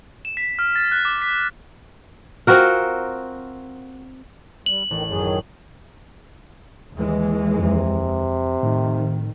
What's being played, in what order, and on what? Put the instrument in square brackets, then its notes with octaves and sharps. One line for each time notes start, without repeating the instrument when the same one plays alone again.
[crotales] E7
B6
F6
A6
F#6
D6
B6
[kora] C4 F4 F#4 A#4
[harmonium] G3 [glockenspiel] F#7
[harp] A1 [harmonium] D#3
[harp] F#2 [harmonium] D#3 F#3 G#4
[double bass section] D#2 E3 G#3
[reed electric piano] F2 [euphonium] C3
[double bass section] F2 D#3 [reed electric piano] A2